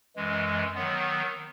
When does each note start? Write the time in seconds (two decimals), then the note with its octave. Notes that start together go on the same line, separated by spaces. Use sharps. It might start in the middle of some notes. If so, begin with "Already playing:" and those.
0.16 F#2 E3 G#3
0.75 D#3 F#3 B3